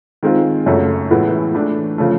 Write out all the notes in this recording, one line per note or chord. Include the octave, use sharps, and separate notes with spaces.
D#3 G#3 C4 F4
F#2 C#3 F#3 A3
A2 E3 G#3 B3 E4
E3 A3 D4
C#3 F3 A3